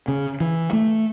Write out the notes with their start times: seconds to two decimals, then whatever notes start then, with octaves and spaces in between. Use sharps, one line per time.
0.08 C#3
0.40 E3
0.73 A3